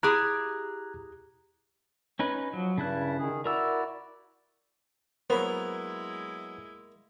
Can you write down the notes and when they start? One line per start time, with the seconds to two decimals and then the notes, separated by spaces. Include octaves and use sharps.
0.03 E4 G4 G#4 A#5 F#6 G#6
2.19 C#4 D#4 B4
2.53 F3 F#3
2.78 G2 C#3 G3 E4 A5 F#6
3.18 D#3 G#4
3.45 E4 F#4 A#4 D5 A#5 E6
5.30 F#3 G#3 A#3 B3 E4 C5 B5